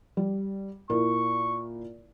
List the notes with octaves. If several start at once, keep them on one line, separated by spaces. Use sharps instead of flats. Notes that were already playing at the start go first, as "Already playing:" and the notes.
G3
A#2 E4 A#4 C#6